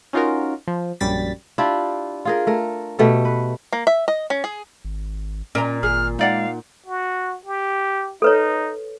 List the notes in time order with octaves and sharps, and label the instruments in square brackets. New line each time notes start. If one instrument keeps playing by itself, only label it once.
[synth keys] C#4 D#4 F4 F#4 A#4
F3
A#1 F#2 G3 A6 B6
[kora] D4 E4 F4 G4
F4 G#4 A#4
A3 A#4
B2 A3 G4 A4
B4
[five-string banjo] A#3
E5
D#5
C#4
G#4
[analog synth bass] G#1
[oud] A#2 [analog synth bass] C#4 [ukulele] A#4 A#5
[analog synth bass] G#1 [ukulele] G#4 [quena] F6
[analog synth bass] G#3 [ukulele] D#4 D5 F#5 [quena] F5
[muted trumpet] F#4
G4
[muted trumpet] D#4 [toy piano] A4 B4 C#5